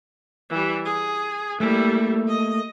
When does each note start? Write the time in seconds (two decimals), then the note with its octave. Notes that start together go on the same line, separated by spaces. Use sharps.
0.50 E3 G3
0.85 G#4
1.60 G3 A3 A#3 E4
2.28 D#5